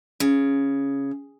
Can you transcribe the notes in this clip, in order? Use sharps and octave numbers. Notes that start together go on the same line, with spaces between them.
C#3